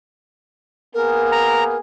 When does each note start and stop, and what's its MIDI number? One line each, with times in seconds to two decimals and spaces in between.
0.94 1.79 58
0.94 1.79 59
0.94 1.79 68
0.94 1.76 70
1.32 1.64 82